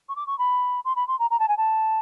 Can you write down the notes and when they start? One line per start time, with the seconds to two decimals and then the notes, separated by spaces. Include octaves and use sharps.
0.09 C#6
0.16 D6
0.27 C#6
0.39 B5
0.85 C6
0.96 B5
1.08 C6
1.19 A#5
1.30 A#5
1.39 A5
1.48 G#5
1.57 A5